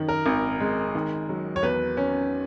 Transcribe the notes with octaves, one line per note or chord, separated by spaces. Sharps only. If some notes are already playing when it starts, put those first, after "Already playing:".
Already playing: F#2 D#3
A#4
G#1
G#3
D#3
F#3
C#5
E2 B4
C#4